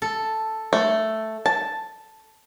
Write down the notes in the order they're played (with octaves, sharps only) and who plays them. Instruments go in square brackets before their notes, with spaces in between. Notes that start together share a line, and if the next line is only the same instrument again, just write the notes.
[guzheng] A4
[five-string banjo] A3
A5